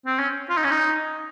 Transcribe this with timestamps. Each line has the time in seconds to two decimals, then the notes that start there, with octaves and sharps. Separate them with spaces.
0.06 C4
0.19 C#4
0.50 F4
0.57 D#4
0.64 C#4
0.71 D#4